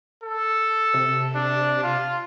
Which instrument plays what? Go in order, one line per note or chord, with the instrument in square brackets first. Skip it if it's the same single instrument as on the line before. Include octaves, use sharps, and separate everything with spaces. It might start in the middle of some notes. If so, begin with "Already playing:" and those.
[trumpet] A4
[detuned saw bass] C3
[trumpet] D4
F4